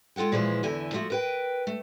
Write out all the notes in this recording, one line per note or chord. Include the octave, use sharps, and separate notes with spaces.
G#3 F4 A4 F#5 G5
A#2 E3 F3 G#3 E4 B4
E2 D3 E4 A4 G#5
F3 A3 F4 F#4 E5
A#4 B4 G5
A3